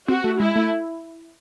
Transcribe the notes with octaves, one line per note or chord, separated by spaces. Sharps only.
C4 F#4
A3
G#3 E4
A3